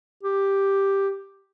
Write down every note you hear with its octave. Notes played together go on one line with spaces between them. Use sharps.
G4